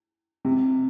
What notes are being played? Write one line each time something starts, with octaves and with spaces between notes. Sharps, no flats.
C3